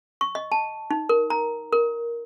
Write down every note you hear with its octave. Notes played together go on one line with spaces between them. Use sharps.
C#6
D#5
A5
D#4
A#4
A#5
A#4